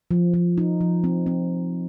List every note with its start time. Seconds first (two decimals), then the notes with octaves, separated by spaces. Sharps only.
0.11 F3
0.34 F3
0.58 D#4
0.81 F3
1.04 C4
1.26 C4